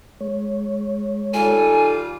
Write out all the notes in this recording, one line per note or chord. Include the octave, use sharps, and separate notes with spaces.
G#3 C#5
D#3 G3 D#4 F4 A4 G#5